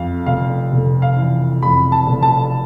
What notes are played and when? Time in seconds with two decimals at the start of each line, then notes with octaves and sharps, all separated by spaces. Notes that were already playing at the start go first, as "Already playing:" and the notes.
Already playing: F2 F5
0.26 F1 F5
0.72 F1
1.02 F5
1.16 E3
1.62 F2 B5
1.92 A5
2.07 F1
2.23 A5